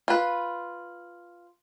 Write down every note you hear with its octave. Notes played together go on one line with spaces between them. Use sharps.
F4 B4